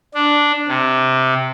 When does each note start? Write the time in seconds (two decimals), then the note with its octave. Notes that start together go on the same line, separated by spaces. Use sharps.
0.15 D4
0.68 C3